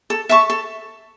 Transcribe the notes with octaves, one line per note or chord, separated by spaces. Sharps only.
A4
E5 A5 C#6
A4